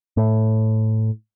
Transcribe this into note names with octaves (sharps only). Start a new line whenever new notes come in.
A2